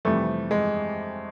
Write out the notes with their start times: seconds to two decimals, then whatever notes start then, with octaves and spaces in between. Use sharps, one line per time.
0.05 F2 C3 E3 G3 A3
0.51 G#3